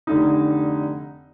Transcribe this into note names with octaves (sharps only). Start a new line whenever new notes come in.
F1 D3 D#4